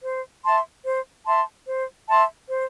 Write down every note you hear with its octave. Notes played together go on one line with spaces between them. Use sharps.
C5
E5 A5 C6
C5
E5 A5 C6
C5
E5 A5 C6
C5